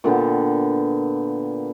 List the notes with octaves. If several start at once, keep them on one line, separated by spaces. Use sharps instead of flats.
A#2 D3 B3 G5